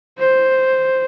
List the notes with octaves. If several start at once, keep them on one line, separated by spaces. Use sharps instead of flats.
C5